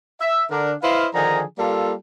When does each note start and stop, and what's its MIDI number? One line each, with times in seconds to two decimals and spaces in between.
0.21 0.44 76
0.51 0.72 50
0.51 0.72 62
0.51 0.72 70
0.83 1.07 64
0.83 1.07 71
0.83 1.07 72
0.83 1.07 75
0.83 1.07 77
1.14 1.43 50
1.14 1.43 51
1.14 1.43 53
1.14 1.43 68
1.14 1.43 80
1.14 1.43 82
1.59 1.92 55
1.59 1.92 58
1.59 1.92 65
1.59 1.92 69